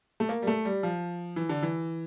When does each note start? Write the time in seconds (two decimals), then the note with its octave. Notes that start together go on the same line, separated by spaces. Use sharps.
0.20 A3
0.29 A#3
0.42 G3
0.47 A3
0.65 G3
0.83 F3
1.36 E3
1.49 D3
1.62 E3